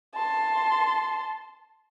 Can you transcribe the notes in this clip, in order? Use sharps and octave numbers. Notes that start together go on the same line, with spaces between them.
A5 C6